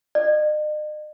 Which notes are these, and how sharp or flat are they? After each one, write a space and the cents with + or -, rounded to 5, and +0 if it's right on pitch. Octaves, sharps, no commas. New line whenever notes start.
D#5 -45